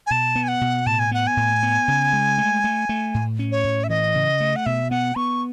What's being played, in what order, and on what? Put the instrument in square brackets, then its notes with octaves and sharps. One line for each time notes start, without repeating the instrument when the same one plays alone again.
[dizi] G#5
[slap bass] B2 [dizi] A5
[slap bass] B3
[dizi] G#5
F#5
[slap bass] B2
[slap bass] A2 [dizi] A5
[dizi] G#5
[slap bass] B3 [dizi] F#5
[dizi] G#5
[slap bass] A2
B3
C#3
G#3
A3
A3
A3
A2
C#4
[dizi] C#5
[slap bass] A2
[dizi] E5
[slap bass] E3 [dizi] D#5
[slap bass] C#3
A3
[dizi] F#5
[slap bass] B2 [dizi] E5
[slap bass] B3 [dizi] F#5
[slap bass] B3 [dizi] C#6